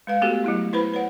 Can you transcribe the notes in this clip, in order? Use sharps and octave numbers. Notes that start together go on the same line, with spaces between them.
G#3 B4 F5
A3 B3 F#4 G4 A4
F#3 A3 E4
E4 B4 C5 B5
B4 C#5 F#5